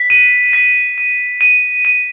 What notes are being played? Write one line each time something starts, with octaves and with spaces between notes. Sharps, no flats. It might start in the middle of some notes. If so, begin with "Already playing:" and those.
Already playing: B6
D#7
B6
D#7
D#7
D#7